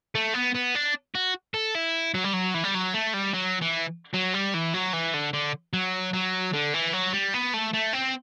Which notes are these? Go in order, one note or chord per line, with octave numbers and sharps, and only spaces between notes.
A3
B3
B3
D4
F#4
A4
E4
F#3
G3
F#3
E3
G3
F#3
A3
G3
F#3
E3
F#3
G3
E3
F#3
E3
D3
D3
F#3
F#3
D3
E3
F#3
G3
B3
A3
A3
C4